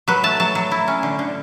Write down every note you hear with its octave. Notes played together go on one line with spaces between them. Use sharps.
F#3 B4
A3 A5
F#3 A5
F#3
E4
C#4
D3
D3